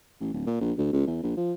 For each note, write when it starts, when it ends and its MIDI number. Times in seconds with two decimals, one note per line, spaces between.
0.20 0.33 33
0.34 0.44 26
0.47 0.57 46
0.61 0.72 34
0.78 0.90 38
0.93 1.07 37
1.07 1.20 40
1.23 1.34 34
1.37 1.53 53